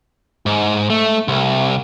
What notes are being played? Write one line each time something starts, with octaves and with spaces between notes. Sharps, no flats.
G#2
A3
C2